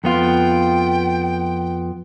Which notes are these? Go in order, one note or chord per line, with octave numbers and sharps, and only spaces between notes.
F2 B3 F4 G5